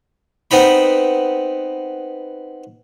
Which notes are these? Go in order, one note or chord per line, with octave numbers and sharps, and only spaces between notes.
B3 C4 D#4 B5